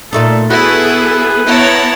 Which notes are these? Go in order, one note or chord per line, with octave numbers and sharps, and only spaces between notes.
A#2 A3 D#4 A4
B3 E4 F#4 G#4 A4 B4
B3 E4 C#5 A5 A#5